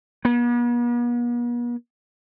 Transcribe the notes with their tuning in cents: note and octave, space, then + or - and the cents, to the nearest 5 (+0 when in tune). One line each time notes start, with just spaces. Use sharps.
B3 -45